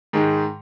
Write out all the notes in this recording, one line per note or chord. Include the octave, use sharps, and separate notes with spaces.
G#2 D#3 G#3